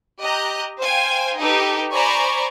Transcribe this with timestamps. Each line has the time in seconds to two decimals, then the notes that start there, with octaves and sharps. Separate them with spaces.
0.21 G4 D#5 A#5 F#6 G6
0.78 C5 F5 G5 G#5
1.37 D#4 G4 A4 B4
1.94 C5 D5 G#5 A#5 B5 C#6